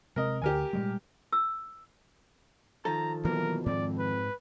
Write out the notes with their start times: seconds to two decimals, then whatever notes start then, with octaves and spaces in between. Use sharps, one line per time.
0.16 C3 G#3 C4 A#4 D#5
0.42 D2 D3 G4 A#4 G#5
0.73 A#2 G3 G#3
1.33 E6
2.85 D#3 F3 A4 A#5
3.25 B2 E3 F#3 A#3 A#4
3.66 F2 G#2 C4 D5
3.99 B4